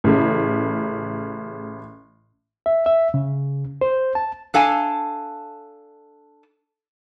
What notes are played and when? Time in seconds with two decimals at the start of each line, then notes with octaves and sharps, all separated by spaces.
0.04 A1 C#3 A3
2.66 E5
2.86 E5
3.14 C#3
3.81 C5
4.15 A5
4.54 D4 A4 F5 G#5 A5